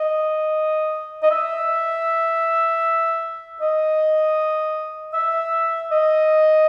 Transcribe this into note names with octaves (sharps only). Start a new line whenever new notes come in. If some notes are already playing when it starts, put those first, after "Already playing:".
Already playing: D#5
D#5
E5
D#5
E5
D#5